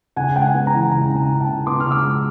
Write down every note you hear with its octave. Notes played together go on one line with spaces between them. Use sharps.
C#3 F#5 G#5
G#3 G5
F#5 G#5
B3
G#5 A#5
E3
C#3 G#5 A#5
C#3
G#5 A#5
C#3
G5 A5
C#3
B3 C6 D6
F6
C#3
D6 E6
G#3